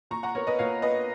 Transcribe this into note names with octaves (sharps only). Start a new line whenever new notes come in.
A#2 A#5 C#6
F#5 A#5
B3 A#4 C#5
B4 D#5
A#2 C#5 F5
B3 B4 D#5